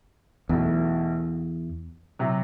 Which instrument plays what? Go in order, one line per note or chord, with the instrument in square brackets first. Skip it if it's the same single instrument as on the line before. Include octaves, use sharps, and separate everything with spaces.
[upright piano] B1 B2 A3 [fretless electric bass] E2
[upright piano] C3 F#3